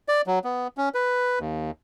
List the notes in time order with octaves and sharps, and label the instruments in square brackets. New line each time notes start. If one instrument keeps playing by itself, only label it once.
[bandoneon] D5
F#3
B3
C#4
B4
D#2